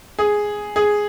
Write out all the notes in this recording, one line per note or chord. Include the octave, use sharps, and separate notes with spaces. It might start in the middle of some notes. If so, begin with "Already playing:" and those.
G#4
G#4